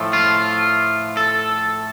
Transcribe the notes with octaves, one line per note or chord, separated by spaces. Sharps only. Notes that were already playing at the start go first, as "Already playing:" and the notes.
Already playing: A2 F3 A3
F4
A4